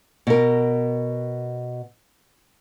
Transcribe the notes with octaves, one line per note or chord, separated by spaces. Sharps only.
B2 A#4